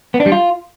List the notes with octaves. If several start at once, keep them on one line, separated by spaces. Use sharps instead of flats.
B3
D4
G3
F4